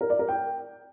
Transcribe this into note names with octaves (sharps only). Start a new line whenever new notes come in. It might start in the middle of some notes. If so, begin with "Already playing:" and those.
A#4
D5
A#4
G5